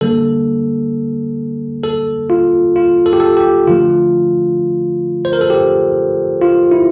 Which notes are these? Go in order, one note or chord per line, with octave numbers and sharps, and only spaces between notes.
D3 G3 A#3 A4
A4
F4
F4
A4
G4
A4
G4
D3 F3 A3 F4
C5
A#4
A4
G4
F4
E4